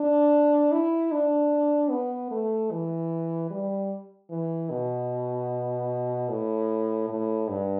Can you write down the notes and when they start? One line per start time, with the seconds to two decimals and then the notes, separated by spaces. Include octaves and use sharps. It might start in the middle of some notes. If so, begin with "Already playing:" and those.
Already playing: D4
0.72 E4
1.11 D4
1.90 B3
2.31 A3
2.71 E3
3.51 G3
4.30 E3
4.70 B2
6.29 A2
7.09 A2
7.49 G2